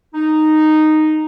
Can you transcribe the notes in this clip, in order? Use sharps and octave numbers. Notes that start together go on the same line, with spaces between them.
D#4